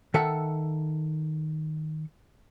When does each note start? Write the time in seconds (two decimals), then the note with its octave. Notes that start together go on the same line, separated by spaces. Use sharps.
0.14 D#3 A4 E5 F#5